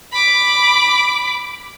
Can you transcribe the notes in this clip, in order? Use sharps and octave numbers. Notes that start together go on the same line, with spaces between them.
B5 D6